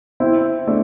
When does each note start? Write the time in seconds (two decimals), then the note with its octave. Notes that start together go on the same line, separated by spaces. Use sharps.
0.20 C4 E4
0.67 A3 D4